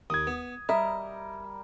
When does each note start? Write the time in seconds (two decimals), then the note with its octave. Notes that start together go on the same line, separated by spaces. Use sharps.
0.10 D#2 D#6 G#6
0.27 B3
0.69 G3 A#4 D#5 E5 A#5